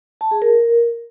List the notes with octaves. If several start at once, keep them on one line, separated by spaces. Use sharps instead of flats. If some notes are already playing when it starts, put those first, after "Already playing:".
A5
G#4
A#4